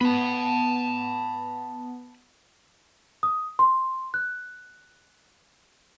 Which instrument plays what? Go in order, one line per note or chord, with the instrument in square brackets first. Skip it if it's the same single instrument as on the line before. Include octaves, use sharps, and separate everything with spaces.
[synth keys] B3 [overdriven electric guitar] A5 B5
[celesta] D#6
C6
F#6